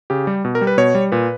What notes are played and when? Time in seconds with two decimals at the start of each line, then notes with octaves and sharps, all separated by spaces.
0.10 C#3 G4
0.27 G3
0.45 B2
0.55 A#4
0.61 G3
0.67 B4
0.78 B2 C#5
0.95 G3
1.12 A#2 B4